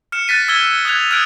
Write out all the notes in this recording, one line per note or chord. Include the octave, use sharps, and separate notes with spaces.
F6 C#7 E7
F#6 A6 B6 D#7
E6 G#6 G7
D#6 F#6 G#6 F7
D#6 F6 F#6 G#6 D7